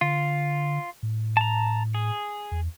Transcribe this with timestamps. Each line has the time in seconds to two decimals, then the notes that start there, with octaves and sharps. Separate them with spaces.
0.01 D3 F4
1.03 A2
1.37 A5 A#5
1.94 G#4
2.52 E2